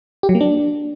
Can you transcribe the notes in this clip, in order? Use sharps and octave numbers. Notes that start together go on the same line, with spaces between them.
G4
F#3
A#3
D4